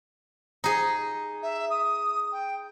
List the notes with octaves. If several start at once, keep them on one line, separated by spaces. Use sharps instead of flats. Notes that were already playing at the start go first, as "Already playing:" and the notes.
D#4 G#4
E5
D#6
G5